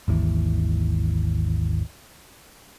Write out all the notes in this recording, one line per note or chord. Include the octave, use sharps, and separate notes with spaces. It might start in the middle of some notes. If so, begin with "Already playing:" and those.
G#1 D#2 E3